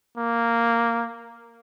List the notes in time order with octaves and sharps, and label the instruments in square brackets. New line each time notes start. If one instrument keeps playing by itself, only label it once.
[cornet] A#3